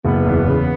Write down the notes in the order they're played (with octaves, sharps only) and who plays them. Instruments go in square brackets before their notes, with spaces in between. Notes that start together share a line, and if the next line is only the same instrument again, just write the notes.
[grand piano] F#1 [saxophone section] B3
[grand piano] E2
C#3